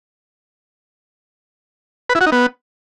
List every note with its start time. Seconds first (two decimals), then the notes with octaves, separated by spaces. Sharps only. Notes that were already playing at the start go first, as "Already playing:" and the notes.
2.09 B4
2.15 E4
2.21 F#4
2.26 D#4
2.32 B3